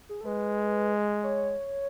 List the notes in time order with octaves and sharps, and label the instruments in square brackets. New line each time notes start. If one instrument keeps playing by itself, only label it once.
[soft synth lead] G#4
A4
[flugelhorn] G#3 [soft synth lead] B4
[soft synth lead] C#5